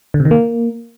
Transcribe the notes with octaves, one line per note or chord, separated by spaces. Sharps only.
D3
C3
D#3
A#3